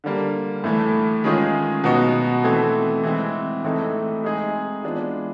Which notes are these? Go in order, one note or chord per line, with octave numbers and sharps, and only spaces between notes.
D3 G3 A#3
A2 E3 A3
D#3 G#3 C#4 F4 G#4
B2 F#3 B3 D#4 F#4
E3 A3 C4
E3 G#3 C4
A2 E3 A3 C4 D#4
G#3 C4 D#4 G#4
E3 G#3 B3 D4 F4